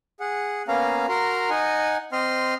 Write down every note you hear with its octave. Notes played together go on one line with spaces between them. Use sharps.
G#4 F#5
A#3 B3 C#4 F5 A#5
F#4 A#4 A#5 C6
D#4 D#5 F#5 G#5
C4 D#5 C6 F6